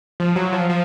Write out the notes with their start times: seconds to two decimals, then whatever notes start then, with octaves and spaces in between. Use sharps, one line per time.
0.20 F3
0.36 F#3
0.53 F3
0.69 F3